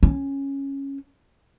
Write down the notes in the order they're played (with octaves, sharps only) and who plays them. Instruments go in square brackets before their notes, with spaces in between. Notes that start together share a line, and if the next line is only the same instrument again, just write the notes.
[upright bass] C#4